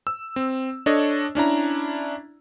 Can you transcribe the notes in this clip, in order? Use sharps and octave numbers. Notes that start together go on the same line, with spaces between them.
E6
C4
D4 A4 C#5 D#5
C#4 D4 E4 A#5